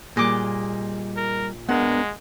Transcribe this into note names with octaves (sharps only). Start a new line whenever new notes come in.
A#2 G3 G#4 D#5 D6 F#6
A#4
G#3 B3 D4 A#4 F#5